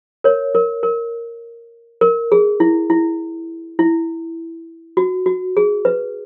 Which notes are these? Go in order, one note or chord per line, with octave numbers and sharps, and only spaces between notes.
A#4 C#5
A#4
A#4
A#4
G#4
E4
E4
E4
F#4
F#4
G#4
B4